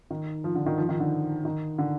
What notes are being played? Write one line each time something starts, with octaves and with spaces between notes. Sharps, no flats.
D#3
F3
D3
D#3
F3
D#3
D3
D#3
D3